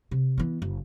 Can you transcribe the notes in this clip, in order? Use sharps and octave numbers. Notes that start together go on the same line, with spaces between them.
C3
E3 B3
F#1